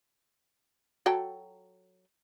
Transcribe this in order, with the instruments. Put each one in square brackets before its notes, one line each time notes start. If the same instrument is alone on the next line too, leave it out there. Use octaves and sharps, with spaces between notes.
[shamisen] F#3 A4 G5